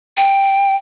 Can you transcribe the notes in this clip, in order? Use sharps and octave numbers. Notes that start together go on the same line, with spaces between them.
G5